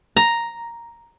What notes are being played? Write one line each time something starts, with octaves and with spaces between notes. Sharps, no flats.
A#5